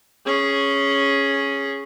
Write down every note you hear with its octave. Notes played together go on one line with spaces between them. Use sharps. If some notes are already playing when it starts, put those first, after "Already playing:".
C#4 G#4